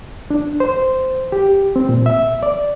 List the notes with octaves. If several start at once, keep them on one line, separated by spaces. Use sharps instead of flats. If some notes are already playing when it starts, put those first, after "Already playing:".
D4
C5
G4
C4
A#2
E5
D5